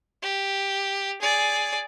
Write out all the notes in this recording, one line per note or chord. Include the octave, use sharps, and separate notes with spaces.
G4
G#4 D5